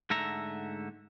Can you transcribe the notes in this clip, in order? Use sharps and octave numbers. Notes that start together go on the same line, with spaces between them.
G#2 D3 A3 A4 E5 A#5